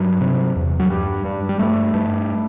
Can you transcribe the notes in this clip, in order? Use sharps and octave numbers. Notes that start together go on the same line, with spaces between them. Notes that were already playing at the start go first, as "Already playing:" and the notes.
Already playing: G2 F#3
C3
E2
F#3
G2 G3
G2
G3
G2 A3
G2